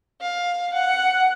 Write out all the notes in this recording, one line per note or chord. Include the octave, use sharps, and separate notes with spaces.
F5
F#5